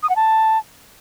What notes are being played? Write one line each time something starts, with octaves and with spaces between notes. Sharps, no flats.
D#6
F#5
A5